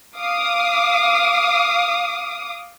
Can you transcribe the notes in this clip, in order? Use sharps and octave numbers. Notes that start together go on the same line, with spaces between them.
F5 D6 D#6